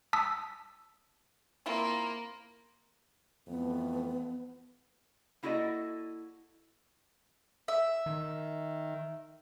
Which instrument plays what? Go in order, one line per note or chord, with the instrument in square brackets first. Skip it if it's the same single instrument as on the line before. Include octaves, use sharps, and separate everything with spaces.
[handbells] A5 D#6 E6 B6
[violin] A#3 [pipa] C4 E4 F4
[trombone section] F2 E3 A3 [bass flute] B3
[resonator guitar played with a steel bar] A#3 E4 F#4 A4 D5 D#5
[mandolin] E5
[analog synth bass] D#3